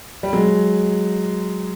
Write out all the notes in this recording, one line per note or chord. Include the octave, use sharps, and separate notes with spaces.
G3
F#3 G#3